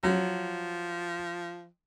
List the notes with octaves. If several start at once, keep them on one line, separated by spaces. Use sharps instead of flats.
F3 F#3